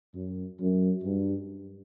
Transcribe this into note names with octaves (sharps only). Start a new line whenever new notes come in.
F#2
F#2
G2